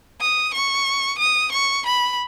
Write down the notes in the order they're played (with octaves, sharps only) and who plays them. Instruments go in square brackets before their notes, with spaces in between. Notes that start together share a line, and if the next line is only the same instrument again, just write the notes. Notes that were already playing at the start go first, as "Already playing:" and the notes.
[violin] D#6
C#6
D#6
C#6
B5